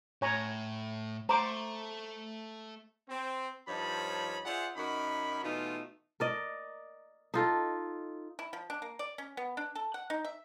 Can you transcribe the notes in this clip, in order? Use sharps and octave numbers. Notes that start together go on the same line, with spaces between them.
A2 C#5 G#5 A#5
A3 C5 A#5 D6
C4
G2 F3 D#4 C#5 A5 B5
F4 G#4 C5 D5 E5 F#5
F#2 D#4 F#4 A#4 B5
B2 E3 A3 D#4 F4
A#4 D5 D#5
D#4 F4 A4
E4
F3
D4
A#3
D5
C#4
B3
D4
A4
F#5
D#4
E5